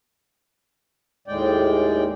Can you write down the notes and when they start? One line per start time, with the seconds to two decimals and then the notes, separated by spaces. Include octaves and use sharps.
1.28 D#2 A2 G#3 D5 G5